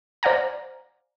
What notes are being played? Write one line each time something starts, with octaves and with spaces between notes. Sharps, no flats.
C5 D5 F5 F#5 G#5 A#5